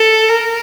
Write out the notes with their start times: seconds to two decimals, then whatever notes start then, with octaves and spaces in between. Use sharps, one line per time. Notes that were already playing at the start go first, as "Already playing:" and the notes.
Already playing: A4
0.28 A#4